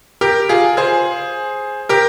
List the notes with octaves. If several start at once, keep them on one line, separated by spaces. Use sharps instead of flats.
G4 A#4
F4 G#4
G#4 C5
G4 A#4